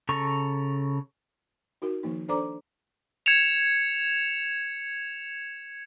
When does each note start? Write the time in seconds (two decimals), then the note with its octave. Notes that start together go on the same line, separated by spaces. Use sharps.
0.09 C#3 A4 A#5 C#6
1.82 D#4 F#4 A#4
2.03 D#3 F3 A#3 D#4
2.29 D4 A4 C5 D5 A#5 D6
3.26 G#6 C#7 E7 F7